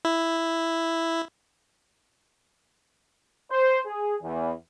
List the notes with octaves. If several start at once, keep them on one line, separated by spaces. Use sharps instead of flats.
E4
C5
G#4
E2